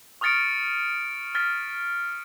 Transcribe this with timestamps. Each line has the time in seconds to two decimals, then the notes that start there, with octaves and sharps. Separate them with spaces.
0.21 C#6 D#6 F6 A6 C#7 D7
1.35 F6 A6 B6